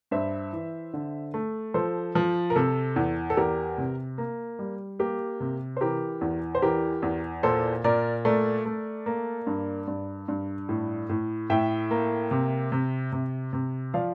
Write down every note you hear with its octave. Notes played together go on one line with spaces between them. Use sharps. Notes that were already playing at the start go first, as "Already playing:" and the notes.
G2 C5 E5
E3
D3
A3
F3 A4 C5
F3
A#4
C3 A4
E2
A4
E2 G4 A#4
C3
A#3
G3
A#3 G4
C3
C5
E3 G4 A#4
E2
C5
E3 G4 A#4
E2
A#2 A4 C5
A#2 A#4 D5
A3 A#4 D5
A3
A#3
G2
G2
G2
A2
A2
A2 E5 G5
A#3
C3
C3
C3
C3
F3 D5 F5